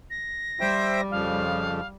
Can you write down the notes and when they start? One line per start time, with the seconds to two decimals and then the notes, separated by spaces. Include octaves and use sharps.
0.10 A#6
0.61 G3 C5 E5 G5
1.11 F2 C#3 F3 F5